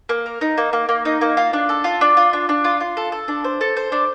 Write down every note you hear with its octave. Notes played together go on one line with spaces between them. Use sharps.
A#3
A#4
D#4
A#3
A#3
A#3
D#4
A#3
F4
D4
A4
F4
D4
F4
D4
D4
F4
F4
A4
A4
D4
C5
A4
C5
D4